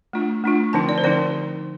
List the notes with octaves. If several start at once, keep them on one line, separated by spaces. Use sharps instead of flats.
A3 D4 F4
A3 D4 F4
D3 F3 C4 D#4 A5
D5
C5
D3 F3 C4 D#4 D5